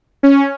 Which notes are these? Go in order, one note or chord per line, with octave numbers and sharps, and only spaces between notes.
C#4